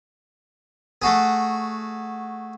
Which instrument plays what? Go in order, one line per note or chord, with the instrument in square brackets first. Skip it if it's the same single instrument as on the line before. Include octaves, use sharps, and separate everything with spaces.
[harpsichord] A3 F#4 G#4